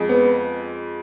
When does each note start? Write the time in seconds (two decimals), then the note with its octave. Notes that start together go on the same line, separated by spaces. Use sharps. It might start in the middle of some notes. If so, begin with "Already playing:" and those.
Already playing: F2 G#3
0.09 B3